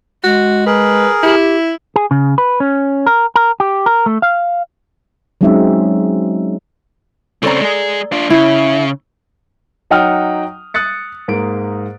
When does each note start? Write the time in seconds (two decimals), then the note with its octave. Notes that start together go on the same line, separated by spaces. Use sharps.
0.24 G#3 F#4
0.66 G#4 A#4 B4
1.23 E4 G4
1.96 G#4
2.11 C#3
2.38 B4
2.60 C#4
3.06 A#4
3.36 A#4
3.60 G4
3.86 A#4
4.06 A3
4.22 F5
5.41 F#3 G#3 C4 C#4 D#4 E5
7.43 C#3 C4 A4 D5 A#5
7.61 G#3 G#4
8.12 D4 F4
8.30 C#3 E4
9.90 F#3 D#4 F#5 G5 D#6 F6
10.74 D#6 F#6 A6 C#7
11.28 G#2 A#3 D7